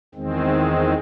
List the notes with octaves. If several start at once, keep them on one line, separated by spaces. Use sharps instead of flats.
E2 D#3 G#3 C4